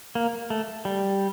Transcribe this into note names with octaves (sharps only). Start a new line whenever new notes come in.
A#3
A3
G3